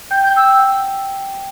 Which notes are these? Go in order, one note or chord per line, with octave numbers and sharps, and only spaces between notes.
G5 G6
G5 G6
G5 E6
G5
F#5